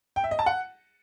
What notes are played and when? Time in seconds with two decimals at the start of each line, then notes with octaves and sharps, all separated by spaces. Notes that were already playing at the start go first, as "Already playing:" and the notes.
0.16 G5
0.24 E5
0.31 D#5
0.39 A5
0.46 F#5